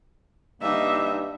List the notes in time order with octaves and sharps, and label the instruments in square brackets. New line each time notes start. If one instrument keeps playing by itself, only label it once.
[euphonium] G2 [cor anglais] A#3 [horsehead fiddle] D#4 E5